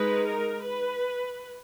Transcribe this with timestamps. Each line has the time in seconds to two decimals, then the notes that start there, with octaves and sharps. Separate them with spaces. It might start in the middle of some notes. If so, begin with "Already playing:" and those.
Already playing: G#3 D#4 B4
0.27 A#4
0.65 B4